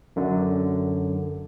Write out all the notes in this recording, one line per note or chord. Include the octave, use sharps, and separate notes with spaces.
F#2 D3